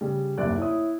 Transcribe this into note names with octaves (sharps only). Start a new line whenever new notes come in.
C#3 G3
F#1 D#2 C3 D5 F#6
E4 C#5 D#6